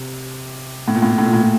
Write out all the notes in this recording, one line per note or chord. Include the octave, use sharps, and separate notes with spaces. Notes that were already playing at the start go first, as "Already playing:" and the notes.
Already playing: C3
A2
A#2
A2
A#2
A2
A#2
A2
A#2